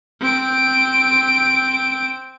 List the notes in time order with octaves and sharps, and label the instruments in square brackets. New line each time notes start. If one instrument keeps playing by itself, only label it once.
[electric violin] C4 D7